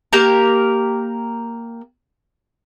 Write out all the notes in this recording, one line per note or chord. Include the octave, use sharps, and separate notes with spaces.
A#3 G4 A#4